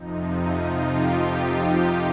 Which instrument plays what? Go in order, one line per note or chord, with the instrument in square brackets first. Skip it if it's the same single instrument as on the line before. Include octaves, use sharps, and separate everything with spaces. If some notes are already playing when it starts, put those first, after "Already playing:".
Already playing: [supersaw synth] F2 C3 F3 D#4
D#4
F4
G4
F4